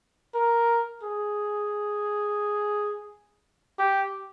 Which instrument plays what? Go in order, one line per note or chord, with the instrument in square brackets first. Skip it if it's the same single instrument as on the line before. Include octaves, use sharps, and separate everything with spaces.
[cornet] A#4
G#4
G4